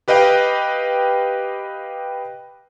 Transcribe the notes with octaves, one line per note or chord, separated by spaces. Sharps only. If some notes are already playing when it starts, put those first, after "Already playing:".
G4 B4 D#5 F5 G5